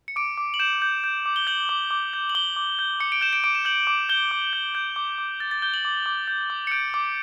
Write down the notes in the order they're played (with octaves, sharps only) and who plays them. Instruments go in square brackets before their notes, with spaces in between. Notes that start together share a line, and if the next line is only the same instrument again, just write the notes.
[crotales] C#7
D6 D7
D6
F#7
G6 E7
G6
G6
D6
G7
G6 F#7
D6
D6
G6
F#7
D6 G7
D6
G6
D6 C#7
D7
G6 E7
D7
D6 D7
E7
G6 F#7
D6
G6 G7
D6
G6
G6
D6
D6
G6 A6
A6
G6 G7
F#7
D6
D6
G6
D6
C#7
G6 D7
D6